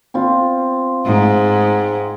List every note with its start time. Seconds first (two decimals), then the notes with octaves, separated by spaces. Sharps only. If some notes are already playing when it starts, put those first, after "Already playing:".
0.14 C4 F4
1.06 G#2